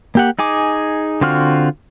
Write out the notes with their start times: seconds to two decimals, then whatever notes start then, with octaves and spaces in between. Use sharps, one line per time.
0.15 A#3 G4 F#5
0.39 D#4 G#4 G#5 D6
1.21 D3 C4 F4 F#4 F6